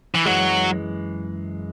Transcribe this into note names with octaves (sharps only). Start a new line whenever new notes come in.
E3
F#2 E3 F#3 G#3